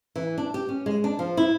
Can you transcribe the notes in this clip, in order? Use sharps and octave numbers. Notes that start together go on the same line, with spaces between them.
E3
D4
G4
C#4
G#3
D4
F3
E4